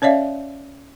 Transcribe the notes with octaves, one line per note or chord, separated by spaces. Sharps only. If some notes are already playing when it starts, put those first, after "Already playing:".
C#4 C#5 D5 E5 F5